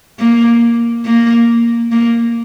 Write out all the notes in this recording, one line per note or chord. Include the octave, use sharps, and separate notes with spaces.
A#3
A#3
A#3